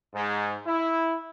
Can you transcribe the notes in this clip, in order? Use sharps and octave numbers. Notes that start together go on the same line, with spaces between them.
G#2
E4